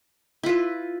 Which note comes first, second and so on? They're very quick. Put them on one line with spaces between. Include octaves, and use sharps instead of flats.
E4 F4 B4